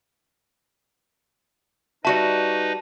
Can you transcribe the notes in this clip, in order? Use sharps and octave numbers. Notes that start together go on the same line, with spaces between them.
G3 D#4 F#4 B4 D#5 E5 A5